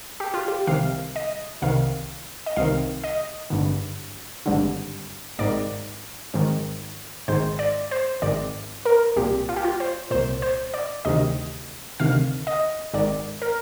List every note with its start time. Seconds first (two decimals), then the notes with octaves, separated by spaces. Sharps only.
0.20 G4
0.34 F4
0.48 G4
0.67 C2 C3 D#3 F5
1.16 D#5
1.62 C2 C3 D#3 F5
2.46 D#5
2.56 C2 C3 D#3 F5
3.04 D#5
3.50 G#1 G2 D3
4.46 G#1 G2 D3
5.39 G#1 G#2 D#3 D5
6.34 G#1 G#2 D#3
7.28 G#1 G#2 D#3 C5
7.59 D5
7.91 C5
8.22 G#1 G#2 D#3 D5
8.86 A#4
9.16 C2 A#2 G4
9.49 F4
9.56 G4
9.64 F4
9.80 C5
10.11 C2 A#2 C5
10.42 C5
10.74 D5
11.05 D2 C3 D#3 D#5
12.00 D2 C3 D#3 F5
12.47 D#5
12.94 G#1 G#2 D#3 D5
13.42 A#4